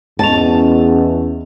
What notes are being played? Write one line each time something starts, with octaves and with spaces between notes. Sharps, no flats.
E2 C#4 D#5 A5